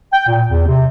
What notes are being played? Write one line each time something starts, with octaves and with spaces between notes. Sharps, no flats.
G5
A#2
E2
C3